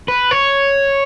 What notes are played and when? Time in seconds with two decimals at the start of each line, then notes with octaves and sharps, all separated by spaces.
0.08 B4
0.31 C#5